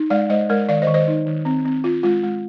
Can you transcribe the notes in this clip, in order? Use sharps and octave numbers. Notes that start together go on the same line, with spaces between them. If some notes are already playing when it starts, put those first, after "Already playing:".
Already playing: D#4
G#3 D5 F5
G#3 C5 D#5
G#3 A#4 D5
D#3 D5 F5
C5 D#5
D#3
C5 D#5
D#4
D#3
C4
C4
F4
G#3 F4
G#3